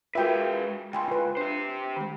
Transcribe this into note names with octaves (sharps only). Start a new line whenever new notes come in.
G#3 F4 F#4 A#4 B4 E5 G5
C#2 G5 G#5 C6
F4 B4
D4 G4 C5
D#3 G#3